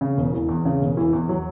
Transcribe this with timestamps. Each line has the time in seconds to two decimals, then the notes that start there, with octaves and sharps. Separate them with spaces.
0.01 C#3
0.17 E1
0.33 E3
0.49 E2
0.65 C#3
0.81 E1
0.97 E3
1.13 E2
1.29 F#3